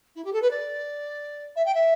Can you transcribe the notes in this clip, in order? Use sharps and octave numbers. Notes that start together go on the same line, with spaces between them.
E4
G4
A4
B4
D5
E5
G5
E5